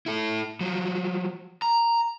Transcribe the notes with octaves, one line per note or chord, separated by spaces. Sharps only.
E4 A4
F3 F#3
A#5